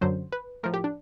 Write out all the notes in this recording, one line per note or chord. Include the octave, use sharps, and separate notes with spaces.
F#2 D3 F#3 C5
B4
A2 F3 A#4
G4
D4